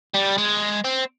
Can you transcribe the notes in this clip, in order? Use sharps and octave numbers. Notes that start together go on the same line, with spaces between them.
G3
G#3
C4